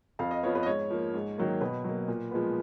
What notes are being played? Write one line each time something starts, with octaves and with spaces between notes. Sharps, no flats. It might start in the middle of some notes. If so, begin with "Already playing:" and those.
F2 F5
D#5
F3 B3 C#5
B4
D#5
G#2 C#5
F3 A#3
G#2
D#3 F#3 A#3
B2 B4
F#3 A#3
A#2
F3 G#3 B3